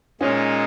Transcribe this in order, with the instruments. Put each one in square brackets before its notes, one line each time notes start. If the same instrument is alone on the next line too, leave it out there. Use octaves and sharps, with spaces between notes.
[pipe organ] A#2 G#3 D#4 [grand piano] C#4